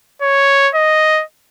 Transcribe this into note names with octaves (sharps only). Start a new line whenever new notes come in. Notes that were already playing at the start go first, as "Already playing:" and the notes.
C#5
D#5